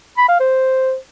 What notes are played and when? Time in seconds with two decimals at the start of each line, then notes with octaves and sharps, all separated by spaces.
0.18 B5
0.29 F5
0.40 C5